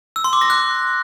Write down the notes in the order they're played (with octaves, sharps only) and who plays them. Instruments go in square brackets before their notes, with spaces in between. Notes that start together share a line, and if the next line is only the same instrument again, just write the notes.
[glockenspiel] E6
C6
D6
A#6
F#6